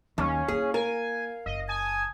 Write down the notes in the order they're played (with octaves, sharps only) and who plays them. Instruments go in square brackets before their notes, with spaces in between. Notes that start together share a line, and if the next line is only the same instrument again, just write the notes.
[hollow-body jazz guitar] D#2 [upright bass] F#3 [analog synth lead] C#4 [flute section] F5
[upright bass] A#3 E4 [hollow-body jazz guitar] G#4
[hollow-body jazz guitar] A#4 [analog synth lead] G#5
[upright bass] F#1 [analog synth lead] D#5
[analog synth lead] G#5 [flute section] A5 D#6 G#6